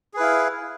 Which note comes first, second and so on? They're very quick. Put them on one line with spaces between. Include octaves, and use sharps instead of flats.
G#4 B4 E4 F5